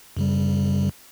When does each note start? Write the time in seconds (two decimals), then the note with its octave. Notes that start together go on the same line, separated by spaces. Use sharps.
0.17 F#2 C#3 G3